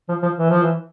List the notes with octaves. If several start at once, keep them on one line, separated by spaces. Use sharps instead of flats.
F3
F3
E3
F3
E3